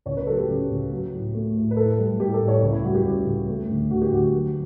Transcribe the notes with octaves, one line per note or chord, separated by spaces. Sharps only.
C#2 C#5
B4
F#3 A4
G4
C#3
C#2
F#3
A2
A3
A2
B4
A2 A4
G3
A2 G4
A4
A2
C#5
C#2 E4
E4
G3 F#4
G4
C#2
C#2
A3
D2
D2 F#4
G4
D2 F#4
F#3